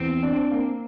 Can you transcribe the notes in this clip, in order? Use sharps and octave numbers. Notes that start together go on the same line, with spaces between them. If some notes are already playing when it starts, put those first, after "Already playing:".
Already playing: E2 C4
D4
A#3